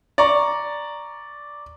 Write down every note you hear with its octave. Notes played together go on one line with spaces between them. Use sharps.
D5 A#5 C#6